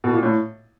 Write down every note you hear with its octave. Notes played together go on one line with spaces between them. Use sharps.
B2
A#2
A2